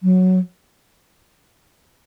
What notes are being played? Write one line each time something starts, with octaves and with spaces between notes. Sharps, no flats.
F#3